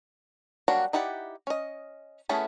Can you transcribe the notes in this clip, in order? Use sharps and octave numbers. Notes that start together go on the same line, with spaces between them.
F#3 G3 A#3 D4 F#4
D#4 E4 G4 D5 F#5
C#4 D#5
A3 B3 C#4 E4 G#4